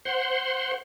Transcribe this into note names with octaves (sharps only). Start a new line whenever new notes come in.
C5 F#5 C6